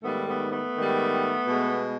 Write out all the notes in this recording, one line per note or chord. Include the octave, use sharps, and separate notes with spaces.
G#2 D#3 G3 A3 B3
A3 B3
A3 B3
G#2 D#3 G3
B2 G#3